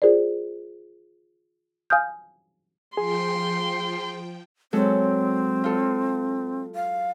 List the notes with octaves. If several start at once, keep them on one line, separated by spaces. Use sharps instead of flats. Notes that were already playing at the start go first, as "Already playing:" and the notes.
F4 G#4 A#4 C5 D5
F5 G#5 D#6 F6 G6
F3 G#4 G5 C6
F#3 G#3 C4 A4
F4 A4
F5